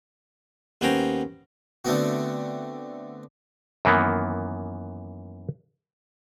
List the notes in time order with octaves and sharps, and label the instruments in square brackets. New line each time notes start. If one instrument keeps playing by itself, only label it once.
[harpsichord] D#2 B3 C#4 C5 G5 A#5
D3 A3 B3 C4 F#4
[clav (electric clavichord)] F#2 D#3 E3 A#3 B3